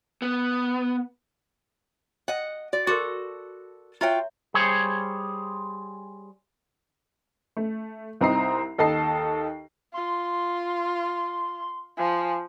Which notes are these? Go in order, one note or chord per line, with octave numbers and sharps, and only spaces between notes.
B3
D#5 F#5
F#4 D5
F#4 A4 A#4 C6 D6
F4 F#4 C#5 E5 G5 A#5
G3 G#4 C5 C#5
A3
C2 C4 D#4 A#5 D#6 C7
D#2 A4 D#5 A5 C7
F4 C6
F3 G#5